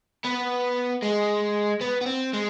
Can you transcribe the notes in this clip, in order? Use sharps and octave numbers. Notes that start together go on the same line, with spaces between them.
B3
G#3
B3
B3
C4
G#3